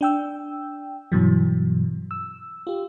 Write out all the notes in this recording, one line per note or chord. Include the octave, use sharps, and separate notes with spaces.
D4 G5 E6
G2 B2 E3 F#3
E6
F4 G4